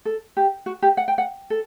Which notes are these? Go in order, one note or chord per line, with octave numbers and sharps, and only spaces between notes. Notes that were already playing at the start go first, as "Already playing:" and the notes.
A4
G4
F#4
G4
F#5
G5
F#5
A4